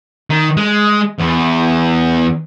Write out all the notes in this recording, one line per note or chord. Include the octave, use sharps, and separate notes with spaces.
D#3
G#3
E2